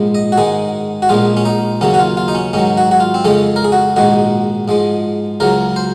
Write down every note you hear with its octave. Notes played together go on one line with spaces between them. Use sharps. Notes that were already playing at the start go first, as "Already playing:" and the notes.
Already playing: A#1 G#2 F3 G#3
D#5
F#4
G#2 D#3 G#3 G#4
F#4
A#1 A#2 F3 G#3 F4
C#4
D#4
D#2 C#3 F#3 C#4
F#4
F4
F4
D#4
C#4
G#2 D#3 F#3 C#4
F#4
F#4
F4
C4
F2 C#3 F3 G#3 C#4
A#4
G#4
F#4
A#1 G#2 D#3 G#3 F#4
G#2 F3 G#3
C#2 C#3 F#3 A#4
C5